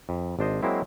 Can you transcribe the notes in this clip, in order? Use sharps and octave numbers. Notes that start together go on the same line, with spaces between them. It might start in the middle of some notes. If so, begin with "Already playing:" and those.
F2
G#1 D4 C5 D#5
F#3 G#3 A#3 C4 E4